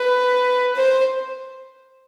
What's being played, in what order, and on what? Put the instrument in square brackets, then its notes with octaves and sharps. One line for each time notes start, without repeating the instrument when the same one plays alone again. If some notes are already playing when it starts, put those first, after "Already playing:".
Already playing: [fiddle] B4
C5